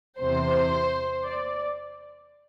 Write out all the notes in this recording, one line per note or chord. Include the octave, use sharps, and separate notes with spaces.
E2 C3 E3 C5
D5